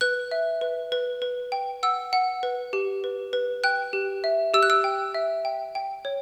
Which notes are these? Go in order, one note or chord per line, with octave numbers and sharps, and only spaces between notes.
B4 F#6
E5
B4
B4
B4
G5
F#5 E6
F#5
B4
G4
B4
B4
G5 F#6
G4
E5
G4 E6
F#6
E6
G5
E5
G5
G5
C#5